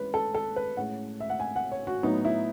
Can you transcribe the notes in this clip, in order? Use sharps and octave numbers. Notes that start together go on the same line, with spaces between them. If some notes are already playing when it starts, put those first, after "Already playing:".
Already playing: E3 G#3 C#4 B4
A4
A4
B4
A2 G#3 C#4 F#5
E5
F#5
G#5
F#5
C#5
F#4
A2 F#3 B3 D#4
E4